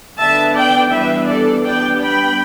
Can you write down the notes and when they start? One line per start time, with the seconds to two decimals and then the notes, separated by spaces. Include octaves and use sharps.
0.19 D3 B3 D4 E5 A5
0.55 D5 G5
0.91 E3 G3 B3 D4 B4 E5
1.27 A4 D5
1.64 G3 B3 D4 D5 G5
2.00 G5 B5